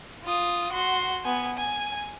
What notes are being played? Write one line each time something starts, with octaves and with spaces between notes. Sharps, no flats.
F4 D#6
F#4 C6
B3 G#5
G#5